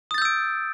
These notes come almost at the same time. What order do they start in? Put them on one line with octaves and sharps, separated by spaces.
D#6 A6 G6 E6 D7